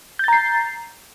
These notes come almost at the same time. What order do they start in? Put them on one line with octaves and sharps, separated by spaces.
G6 A6 A#5 C7